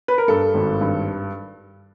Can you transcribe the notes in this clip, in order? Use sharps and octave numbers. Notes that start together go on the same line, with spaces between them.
B4
A#4
G2 A4
G#1
G2